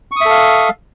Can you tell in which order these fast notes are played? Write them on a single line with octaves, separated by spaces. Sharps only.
C#6 D#6 E5 A4 F5